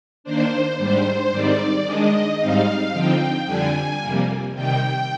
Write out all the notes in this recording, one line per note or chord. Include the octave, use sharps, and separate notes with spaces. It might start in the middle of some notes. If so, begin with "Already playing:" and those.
D#3 A#3 D4 C5
G#2 G3 D4 C5
G#2 D#3 G3 C4 D#4 D5
D#3 G#3 D4 D#5
G#2 G3 C4 D#4 F5
D3 F3 C4 D#4 G5
F2 D3 G3 D4 G#5
F2 C3 G3 A#3
C3 D#3 G3 G5